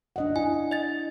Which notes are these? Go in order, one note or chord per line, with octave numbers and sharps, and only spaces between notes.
D4 D#5 F#5
E4 G#5
D#5 A6